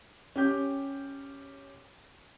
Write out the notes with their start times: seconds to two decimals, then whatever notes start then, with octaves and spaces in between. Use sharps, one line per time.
0.36 C#4 G4 G6